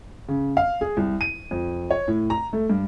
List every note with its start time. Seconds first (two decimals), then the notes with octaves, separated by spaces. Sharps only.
0.28 C#3
0.57 F5
0.81 G#4
0.97 C2
1.21 D#7
1.51 F2
1.91 C#5
2.08 A2
2.30 A#5
2.53 A3
2.70 G2